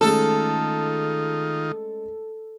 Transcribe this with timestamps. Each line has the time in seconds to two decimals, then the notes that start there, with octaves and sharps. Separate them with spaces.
0.01 D#3 G#3 A3 C#4 D#4 F4 A4